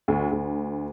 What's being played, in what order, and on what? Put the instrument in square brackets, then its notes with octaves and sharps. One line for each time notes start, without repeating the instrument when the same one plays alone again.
[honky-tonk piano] D2
D2